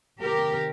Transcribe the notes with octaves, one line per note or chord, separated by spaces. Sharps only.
C3 D#3 G4 A#4